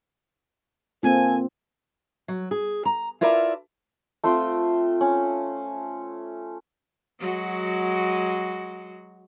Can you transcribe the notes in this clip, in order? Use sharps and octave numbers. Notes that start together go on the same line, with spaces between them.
A#3 C4 F4 A4 G#5
F#3
G#4
A#5
E4 F4 A#4 D5 E5 A5
A3 C4 F4 G5
C#4
F#3 G#3 F#4